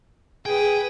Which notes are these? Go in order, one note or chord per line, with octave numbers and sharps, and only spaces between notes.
G#4 B4 G5 G#5 D#6